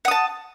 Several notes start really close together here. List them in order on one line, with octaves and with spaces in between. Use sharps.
F#5 D#6 A5